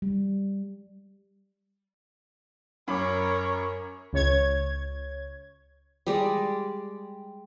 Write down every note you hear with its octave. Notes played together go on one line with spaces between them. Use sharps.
G3
F#2 A#4 C#5 B5 D6
C#2 C#5 G#6
G3 G#3 D5